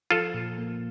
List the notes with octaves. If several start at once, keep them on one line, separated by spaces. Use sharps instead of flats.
F3 F4 A4
A#2
A#3